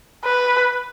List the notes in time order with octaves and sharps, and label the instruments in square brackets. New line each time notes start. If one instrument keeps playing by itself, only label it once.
[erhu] B4